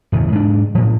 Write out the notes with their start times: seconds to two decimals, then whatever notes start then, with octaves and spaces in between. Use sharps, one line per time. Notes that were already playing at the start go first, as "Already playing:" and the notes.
0.12 D1 E2 C#3
0.32 G#2 D4
0.75 A2 F3